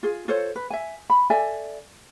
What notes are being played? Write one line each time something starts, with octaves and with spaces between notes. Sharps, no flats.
F4 G#4
F4 A4 C5 C#5
B4
E5 G#5
B5
A4 D5 E5 G#5